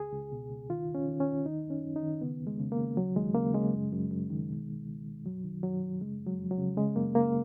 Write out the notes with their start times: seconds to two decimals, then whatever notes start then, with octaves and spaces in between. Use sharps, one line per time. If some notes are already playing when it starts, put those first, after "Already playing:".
Already playing: C#2 G#4
0.12 C#2
0.32 B2
0.50 C#2
0.69 D#3 F4
0.89 D#2
0.95 C#4
1.08 D#3
1.20 C#4
1.26 D#2
1.46 D#3 D#4
1.64 F#2
1.70 C#4
1.83 F#2
1.96 D#4
2.02 D#3
2.21 C#3 B3
2.40 F2
2.47 G#3
2.59 C#3
2.72 A#3
2.78 C#3
2.97 D#2 F#3
3.16 D#2 G#3
3.35 C#3 A#3
3.54 C#3 G#3
3.73 F#2
3.92 F#2
4.11 F#2
4.30 D#3
4.50 B2
4.68 C#2
4.87 C#2
5.06 B2
5.25 F#2 F#3
5.44 D#3
5.63 F#2 F#3
5.82 F#2
6.01 C#3 G#3
6.19 F2
6.26 F#3
6.39 F2
6.51 F#3
6.58 C#3
6.77 C#3 G#3
6.96 F#2 A#3
7.15 C#3 A#3